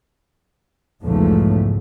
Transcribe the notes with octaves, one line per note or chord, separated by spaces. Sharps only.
B1 E2 G#2 C#3 F3 A3